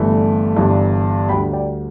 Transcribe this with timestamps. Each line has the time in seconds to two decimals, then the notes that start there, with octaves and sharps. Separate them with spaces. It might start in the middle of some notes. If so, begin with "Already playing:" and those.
Already playing: G1 G2 E3 A3
0.57 G1 G2 E3
1.29 D2 D3 G3 G5 B5
1.53 D5 G5